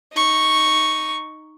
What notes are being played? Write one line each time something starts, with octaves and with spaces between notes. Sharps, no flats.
D#4 C#6